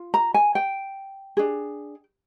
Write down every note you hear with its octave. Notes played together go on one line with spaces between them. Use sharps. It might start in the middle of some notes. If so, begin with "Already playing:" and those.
Already playing: F4
A#5
G#5
G5
D4 G#4